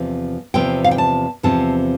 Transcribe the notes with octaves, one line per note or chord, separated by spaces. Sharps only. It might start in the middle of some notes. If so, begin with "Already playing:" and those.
Already playing: E2 C3 F3 C4
E2 C3 F3 C4 G5
F5
G5
A5
E2 C3 F3 C4 A5